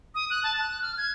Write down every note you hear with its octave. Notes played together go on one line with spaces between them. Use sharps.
D#6
F#6
A5
F#6
F6
G#6